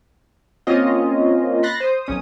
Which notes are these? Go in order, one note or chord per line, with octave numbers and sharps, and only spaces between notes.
A#3 C4 C#4 F4 D#5
B5 C6 F#6 A6 A#6
C5 D#6
B1 C#4 D#6